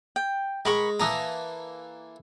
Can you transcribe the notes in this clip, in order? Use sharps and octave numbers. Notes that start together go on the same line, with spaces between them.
G5
G#3 A#4 B5 C#6
E3 A#3 A4 A#5 D#6